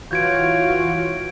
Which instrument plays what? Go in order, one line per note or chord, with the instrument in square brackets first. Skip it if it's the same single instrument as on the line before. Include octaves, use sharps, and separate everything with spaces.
[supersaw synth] E3 F#4 C#5 [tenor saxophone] F4 [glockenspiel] G6 G#6 D7